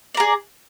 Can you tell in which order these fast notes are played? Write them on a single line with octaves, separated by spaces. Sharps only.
D5 A#5 G#4